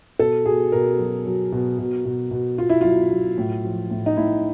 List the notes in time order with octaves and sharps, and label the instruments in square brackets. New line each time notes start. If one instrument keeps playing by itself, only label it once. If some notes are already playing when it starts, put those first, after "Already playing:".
[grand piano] B2 A4
B2 G#4
B2 A#4
F#3
F#3
B2
B2
B2
B2
B2 F4
E4
F#3 F4
F#3
A2
F3
A2
D#4
A2 E4